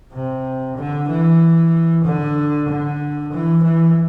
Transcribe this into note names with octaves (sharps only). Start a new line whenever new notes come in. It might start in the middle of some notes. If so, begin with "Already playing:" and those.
C3
D3
E3
D3
D3
E3
E3